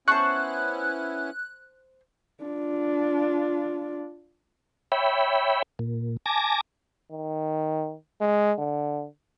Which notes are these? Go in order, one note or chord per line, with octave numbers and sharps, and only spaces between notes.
B3 C#4 E4 C5 A5 C#6 F#6
D4 F4
C#5 E5 G5 B5
A#2
G#5 A5 D6 A#6
D#3
G#3
D3